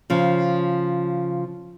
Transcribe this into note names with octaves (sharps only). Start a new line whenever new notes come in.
C#3 F3